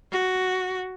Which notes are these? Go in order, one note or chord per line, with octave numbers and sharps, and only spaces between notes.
F#4